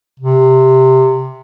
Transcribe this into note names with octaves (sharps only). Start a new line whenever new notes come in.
C3